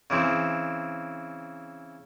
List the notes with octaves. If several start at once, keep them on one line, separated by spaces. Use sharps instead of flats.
C#3 E3 C4